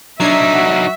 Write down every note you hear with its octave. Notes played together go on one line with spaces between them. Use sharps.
F#3 D4 D#4 E5 G#6 C7
F#4